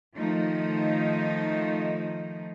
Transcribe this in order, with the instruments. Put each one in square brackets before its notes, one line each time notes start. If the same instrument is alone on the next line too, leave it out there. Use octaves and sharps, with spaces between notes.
[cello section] D#3 F3 A3 D#4